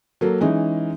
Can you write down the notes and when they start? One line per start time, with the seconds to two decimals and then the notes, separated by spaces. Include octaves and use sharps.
0.21 F#3 A#3 A4
0.41 E3 G#3 C#4 D#4